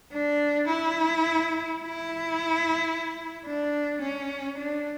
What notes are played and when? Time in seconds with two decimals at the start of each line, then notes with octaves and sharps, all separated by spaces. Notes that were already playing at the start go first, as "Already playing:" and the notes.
0.13 D4
0.68 E4
1.80 E4
3.47 D4
4.02 C#4
4.58 D4